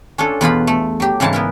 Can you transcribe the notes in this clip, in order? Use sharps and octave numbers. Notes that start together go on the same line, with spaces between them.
C#4 D4 F4 A4
E2 B2 F4 B5
A3
F#3 G4
G#2 C#3 E3 G#3 D#4 A5
B3 E4 A#4